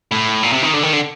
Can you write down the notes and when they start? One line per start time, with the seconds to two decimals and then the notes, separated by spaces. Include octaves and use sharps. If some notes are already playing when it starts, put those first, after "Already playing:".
0.12 A2
0.43 A#2
0.53 C3
0.63 D#3
0.74 D3
0.83 D#3
0.93 D3